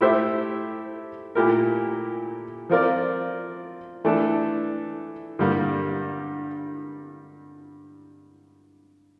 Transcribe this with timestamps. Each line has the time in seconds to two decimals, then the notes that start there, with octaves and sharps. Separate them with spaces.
0.01 A3 E4 G4 C5 E5
1.35 A#2 A3 E4 G4 A#4
2.70 F3 C4 F4 A#4 D5
4.04 E3 A3 D4 A4
5.39 G2 D3 G3 A#3